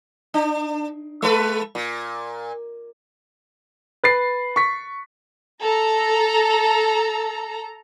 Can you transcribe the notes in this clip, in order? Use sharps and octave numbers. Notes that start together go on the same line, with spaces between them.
D4
G#3 A4 B4
A#2
B4 A6 C7
C#6 B6
A4 A#5